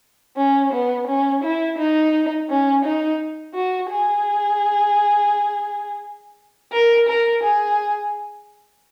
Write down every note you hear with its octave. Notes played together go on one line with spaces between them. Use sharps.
C#4
B3
C#4
E4
D#4
C#4
D#4
F#4
G#4
A#4
A#4
G#4